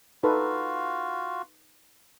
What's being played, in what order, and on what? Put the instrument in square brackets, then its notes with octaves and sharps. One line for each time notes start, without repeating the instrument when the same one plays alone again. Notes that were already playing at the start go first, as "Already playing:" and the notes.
[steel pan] D#4 A4 B4 [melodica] F4 F#4 F5